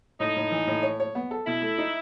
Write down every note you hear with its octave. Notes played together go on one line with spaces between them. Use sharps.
A2 D#4
A2
E3
A2
C#5
C#5
B3
A4
B2 E4
A3
D#4